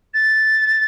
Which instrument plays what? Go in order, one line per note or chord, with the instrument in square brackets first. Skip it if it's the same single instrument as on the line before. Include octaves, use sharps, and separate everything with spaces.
[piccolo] A6